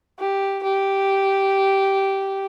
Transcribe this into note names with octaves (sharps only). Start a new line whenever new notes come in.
G4
G4